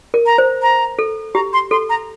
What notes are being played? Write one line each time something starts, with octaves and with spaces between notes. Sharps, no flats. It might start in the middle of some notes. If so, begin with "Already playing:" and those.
A#4
A#5
C5
A#5
A4
G4 A#5
C6
A4 C6
A#5